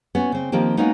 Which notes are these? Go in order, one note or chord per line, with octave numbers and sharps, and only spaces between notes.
B3 C#4 F#4
C#3 C4
D#3 F3 A#3 C4 G4
G#3 A#3 B3 C#4 D#4 F#4